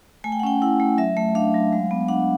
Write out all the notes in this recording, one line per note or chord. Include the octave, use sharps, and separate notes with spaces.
A3 G#5
G5
F#5
C#4 G5
E4 F#5
A3
F#3 E5
A3
D4 F5
F#3
G#3
B3
D4 F#5